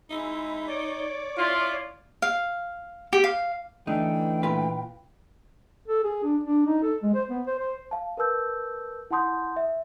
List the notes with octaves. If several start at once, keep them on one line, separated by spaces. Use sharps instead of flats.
G#3 D#4 E4 E5
C#5 D5 D6
E4 F4
F5
G4
F5
E3 A3 D4 D#4 G5
A#2 F4 B4
A4
G#4
D4
D4
D#4
A4
G#3
C5
B3
C5
C5
F5 A5
A#4 B4 A5 E6 G6
E4 F#5 A5 C6 D#6 G6
E5